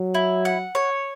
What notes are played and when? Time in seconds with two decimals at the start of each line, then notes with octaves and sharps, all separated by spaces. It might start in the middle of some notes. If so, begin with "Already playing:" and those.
Already playing: F#3
0.15 E4
0.45 F#5
0.75 C#5